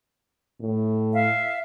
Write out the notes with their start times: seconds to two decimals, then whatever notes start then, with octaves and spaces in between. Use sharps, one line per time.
0.60 A2
1.13 E5 F5